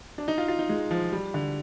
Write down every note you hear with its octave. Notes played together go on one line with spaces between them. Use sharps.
D4
D#4
F4
F4
D#4
G#3
F3
G3
D3